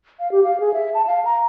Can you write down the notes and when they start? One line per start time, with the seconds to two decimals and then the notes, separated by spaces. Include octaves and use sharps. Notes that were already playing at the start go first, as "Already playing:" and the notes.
0.19 F5
0.31 G4
0.44 F5
0.60 G#4
0.74 E5
0.94 A5
1.07 F5
1.25 A#5